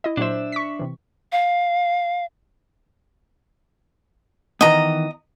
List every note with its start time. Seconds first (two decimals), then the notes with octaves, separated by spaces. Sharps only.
0.04 E4 D#5
0.17 A#2 F#3 D4 C5 E5
0.52 C#6 B6
0.79 C3 E3
1.32 F5
4.61 D#3 E3 B3 D#5 A#5